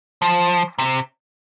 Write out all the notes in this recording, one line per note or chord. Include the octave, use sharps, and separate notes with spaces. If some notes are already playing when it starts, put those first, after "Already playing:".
F3
C3